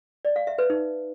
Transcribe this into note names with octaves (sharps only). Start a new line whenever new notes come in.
D5
F5
E5
B4
D#4